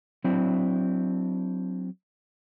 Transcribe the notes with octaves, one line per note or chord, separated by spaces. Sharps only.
F#3 C4 D4 E4